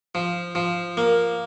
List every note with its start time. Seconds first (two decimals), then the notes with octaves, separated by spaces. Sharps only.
0.15 F3
0.55 F3
0.97 A#3